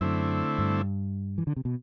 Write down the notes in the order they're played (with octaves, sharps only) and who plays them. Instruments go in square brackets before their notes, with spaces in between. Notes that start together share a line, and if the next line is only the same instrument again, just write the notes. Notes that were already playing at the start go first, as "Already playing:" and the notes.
[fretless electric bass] F#2 [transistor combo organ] D3 A3 C4 E4
[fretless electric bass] G2
E3
D3
C3
B2